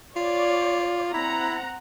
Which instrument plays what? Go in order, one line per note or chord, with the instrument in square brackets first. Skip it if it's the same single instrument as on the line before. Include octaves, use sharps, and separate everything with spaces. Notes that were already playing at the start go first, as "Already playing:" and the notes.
[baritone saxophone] F4 [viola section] C#5 D5
[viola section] C4 F#5 A#5 [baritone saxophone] E4